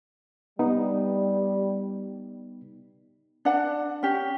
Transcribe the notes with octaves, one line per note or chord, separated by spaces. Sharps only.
G3 B3 D#4
D4 F#5 A5
C#4 G4